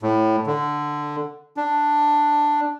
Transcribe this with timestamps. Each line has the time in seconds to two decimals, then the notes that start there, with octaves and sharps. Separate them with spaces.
0.02 A2
0.47 D3
1.57 D4